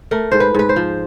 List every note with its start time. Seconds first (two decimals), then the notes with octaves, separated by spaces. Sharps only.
0.11 A3 A#4
0.32 G#2 C5
0.40 B4
0.54 G#2 B4
0.69 C5
0.76 F3